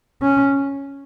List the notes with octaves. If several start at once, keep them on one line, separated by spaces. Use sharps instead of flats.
C#4